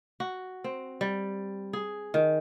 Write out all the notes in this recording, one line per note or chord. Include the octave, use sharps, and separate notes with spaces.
F#4
C4
G3
G#4
D#3